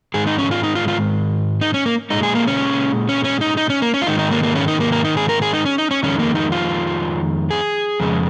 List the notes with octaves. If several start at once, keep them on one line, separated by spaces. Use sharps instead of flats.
G#2 D#3 G#3 G#4
D#4
C#4
F4
D#4
F4
F4
D#4
C#4
A#3
A#2 G#3 D#4
G#4
A#3
C#4
C#4
C#4
D#4
D#4
C#4
A#3
C#4
F4
G#2 D#3 G#3 D#4
D#4
A#3
A#3
C#4
D#4
A#3
A#3
D#4
G#4
A#4
G#4
D#4
C#4
D#4
C#4
F2 D#3 G#3 C#4
A#3
D#4
F4
G#4
F2 C#3 G#3